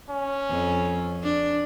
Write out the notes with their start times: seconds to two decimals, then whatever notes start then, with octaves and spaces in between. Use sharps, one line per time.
0.10 C#4
0.50 F2
1.23 D4